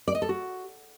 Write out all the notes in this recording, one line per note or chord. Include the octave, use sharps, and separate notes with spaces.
D5
D#5
A4
F#4